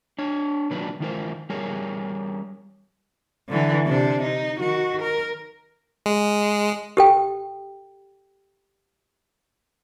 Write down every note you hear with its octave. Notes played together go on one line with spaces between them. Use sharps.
D4 C#5
A#2 D#3 F#3 D4 B4
D#3 E3 F4 A#4 C5
G3 G#4 A#4 C#5
D3 E3
C3 D4
D#4
D#3 F#4
A#4
G#3
G4 A4 G5